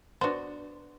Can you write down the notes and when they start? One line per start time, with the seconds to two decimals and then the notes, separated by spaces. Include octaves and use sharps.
0.21 B3 D4 F#4 C5